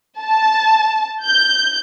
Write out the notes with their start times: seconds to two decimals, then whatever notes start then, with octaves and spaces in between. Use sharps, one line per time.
0.22 A5
1.25 G6